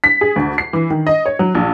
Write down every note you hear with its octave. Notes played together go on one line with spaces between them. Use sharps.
B6
G#4
D2
C7
E3
D#3
D#5
C#5
F#3
A#1